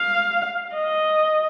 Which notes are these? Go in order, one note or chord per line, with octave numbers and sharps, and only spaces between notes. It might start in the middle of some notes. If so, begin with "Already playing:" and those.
Already playing: F5
D#5